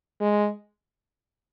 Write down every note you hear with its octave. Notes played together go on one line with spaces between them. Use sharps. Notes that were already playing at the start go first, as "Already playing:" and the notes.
G#3